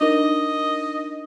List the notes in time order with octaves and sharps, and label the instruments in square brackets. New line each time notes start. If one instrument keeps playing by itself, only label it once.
[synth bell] D4 D#4 A#4 [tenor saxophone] D#5